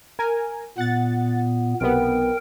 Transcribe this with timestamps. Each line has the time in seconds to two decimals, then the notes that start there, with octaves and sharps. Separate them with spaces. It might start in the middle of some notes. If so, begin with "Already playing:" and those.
0.19 A#4 G#5
0.78 A#2 B3 F#5 A6
1.81 B1 C3 B3 A#4 G5